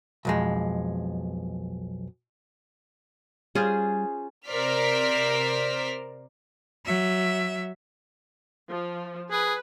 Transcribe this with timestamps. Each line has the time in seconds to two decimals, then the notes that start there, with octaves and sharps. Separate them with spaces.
0.25 B1 F2 G#3
3.55 G3 C#4 F4 G#4 C5
4.49 C3 A#4 C5 D5 F6 B6
6.85 F#3 E5
8.68 F3
9.31 G#4 B4